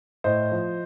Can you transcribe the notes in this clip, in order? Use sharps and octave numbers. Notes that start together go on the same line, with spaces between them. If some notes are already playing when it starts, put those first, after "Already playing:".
A2 C5 D#5
F3